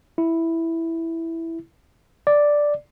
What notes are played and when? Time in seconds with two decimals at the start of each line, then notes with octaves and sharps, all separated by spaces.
0.18 E4
2.27 D5